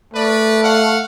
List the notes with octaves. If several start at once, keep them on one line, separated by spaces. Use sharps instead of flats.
A3 B4 D5
F5 F#5